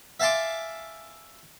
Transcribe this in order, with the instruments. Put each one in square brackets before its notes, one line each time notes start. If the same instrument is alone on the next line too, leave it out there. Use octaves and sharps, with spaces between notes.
[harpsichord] E5 F5 G#5 A5 C6 D6